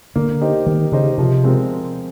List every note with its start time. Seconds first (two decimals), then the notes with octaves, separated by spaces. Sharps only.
0.16 D3 A#3
0.41 D#4 G4 C5 D#5
0.67 D#3 A#3
0.92 C#3 D#4 G4 C5 D#5
1.18 C3 F3
1.44 G#3 C4 F4 A#4